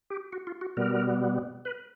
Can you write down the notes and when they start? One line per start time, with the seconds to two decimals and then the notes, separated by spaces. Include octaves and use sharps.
0.10 G4
0.33 F#4
0.47 F4
0.61 F#4
0.77 B2 G3 B3 A#4
1.65 B4